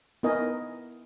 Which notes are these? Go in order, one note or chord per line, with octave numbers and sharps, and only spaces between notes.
B3 D#4 E4 A#4 D#5 G#5